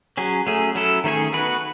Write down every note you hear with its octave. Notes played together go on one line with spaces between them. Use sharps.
F#3 C#4 G#4
F#3 A3 C#4 G#4
F#3 C#4 E4 A4
D#3 A3 C#4 G#4 C#5
B3 F#4 B4